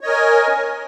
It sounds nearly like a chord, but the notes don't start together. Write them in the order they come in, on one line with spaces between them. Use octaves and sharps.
C#5 D#5 A#4 G#5